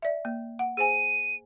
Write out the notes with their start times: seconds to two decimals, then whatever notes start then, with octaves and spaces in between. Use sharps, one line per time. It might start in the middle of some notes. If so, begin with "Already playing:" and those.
0.02 D5 E5
0.25 A#3
0.59 F#5
0.77 G#4 C5 G#5 D#7